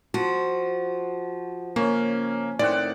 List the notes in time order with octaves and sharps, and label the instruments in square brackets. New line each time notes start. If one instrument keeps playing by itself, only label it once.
[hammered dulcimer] F3 [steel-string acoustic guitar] F#4
[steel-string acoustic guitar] C#3 [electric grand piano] A#3 [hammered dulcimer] C#4
[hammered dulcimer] A2 C4 F#5 [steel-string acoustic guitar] D#3 [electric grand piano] D5